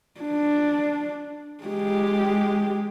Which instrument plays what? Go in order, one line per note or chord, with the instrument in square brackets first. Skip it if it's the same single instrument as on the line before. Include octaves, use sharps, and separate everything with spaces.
[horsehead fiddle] D4
G#3 G4